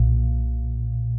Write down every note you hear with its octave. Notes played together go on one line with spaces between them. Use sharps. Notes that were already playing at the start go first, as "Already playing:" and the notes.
Already playing: B1 A#2